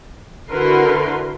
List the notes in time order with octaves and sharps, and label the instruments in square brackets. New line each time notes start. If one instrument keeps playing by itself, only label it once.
[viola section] D3 E4 F#4 A#4 B4 C6